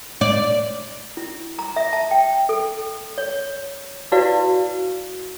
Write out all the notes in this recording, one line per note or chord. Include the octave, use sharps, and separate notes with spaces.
D5
E4
A#5
E5
A5
G5
A4
C#5
E4 F#4 B4 D5 F5